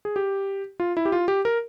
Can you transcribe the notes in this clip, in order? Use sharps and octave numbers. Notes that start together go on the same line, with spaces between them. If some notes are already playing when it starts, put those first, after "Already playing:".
G#4
G4
F4
E4
G4
F4
G4
A#4